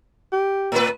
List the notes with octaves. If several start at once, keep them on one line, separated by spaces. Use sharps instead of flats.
G4
A2 B4